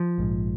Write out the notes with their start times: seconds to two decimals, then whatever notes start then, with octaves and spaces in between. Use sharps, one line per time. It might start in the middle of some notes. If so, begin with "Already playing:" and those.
Already playing: F3
0.18 A#1 G#2